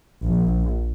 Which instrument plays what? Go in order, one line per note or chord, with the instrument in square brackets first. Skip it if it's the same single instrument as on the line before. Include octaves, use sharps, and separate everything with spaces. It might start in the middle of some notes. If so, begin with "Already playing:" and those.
[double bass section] A#1